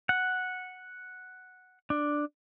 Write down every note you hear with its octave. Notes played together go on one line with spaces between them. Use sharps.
F#5
D4